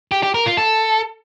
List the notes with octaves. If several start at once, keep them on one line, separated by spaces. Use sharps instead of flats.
G4
G4
A#4
F4
A4